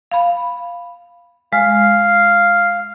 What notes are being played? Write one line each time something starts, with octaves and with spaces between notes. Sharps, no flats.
F5 B5
G#3 F5